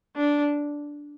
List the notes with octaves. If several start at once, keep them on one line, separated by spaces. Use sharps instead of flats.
D4